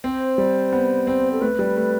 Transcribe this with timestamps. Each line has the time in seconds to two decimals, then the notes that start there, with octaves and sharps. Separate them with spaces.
0.04 C4 C5
0.38 G3
0.72 B3
1.07 C4
1.32 A4
1.41 A3 B4
1.59 G3
1.77 A3